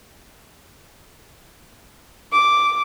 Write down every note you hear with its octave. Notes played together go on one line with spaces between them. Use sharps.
D6